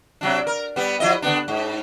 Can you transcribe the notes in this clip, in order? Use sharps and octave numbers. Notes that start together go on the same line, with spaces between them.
C3 F#3 D4
A#4
G3 B3
F3 E4 D#5
D3 B3 D4
G#2